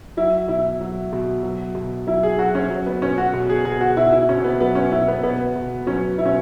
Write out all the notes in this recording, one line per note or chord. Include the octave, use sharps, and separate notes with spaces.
F#3 E4
B2 E4
F#3
B2
F#3
B2
F#3 E4
G#4
F#3 F#4
C#4
F#3
B3
B2 C#4
F#4
B2
G#4
B2 G#4
F#4
B2 E4
E4
B2 C#4
B3
F#3 B3
C#4
B2 E4
B3
B2 B3
B2
F#3 C#4
B2 E4
C#4